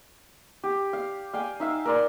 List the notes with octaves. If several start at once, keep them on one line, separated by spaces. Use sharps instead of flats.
G4
F5
F5 G5 G#5
D#4 E5 F5
A#4 D5 C6